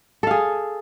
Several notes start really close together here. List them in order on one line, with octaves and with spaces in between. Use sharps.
A4 F5 G#4